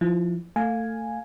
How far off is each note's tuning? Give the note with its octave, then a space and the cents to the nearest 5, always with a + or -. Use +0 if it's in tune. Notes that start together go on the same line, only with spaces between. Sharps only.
F3 +0 E4 +0
A3 +25 F5 +10 G#5 +0